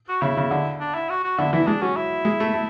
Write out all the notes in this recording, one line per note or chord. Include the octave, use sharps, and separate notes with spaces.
F#4
C#3 E4
C#3
D3
D4
E4
F#4
F#4
D3 E4
E3 E4
G#3 D4
F#3 C#4
E4
G#3
A3
A3